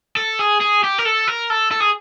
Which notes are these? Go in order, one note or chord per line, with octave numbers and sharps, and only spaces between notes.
A4
G#4
G#4
G4
A#4
A4
A#4
A4
A4
G#4